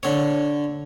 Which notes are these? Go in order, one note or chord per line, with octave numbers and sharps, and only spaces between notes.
D3 C#5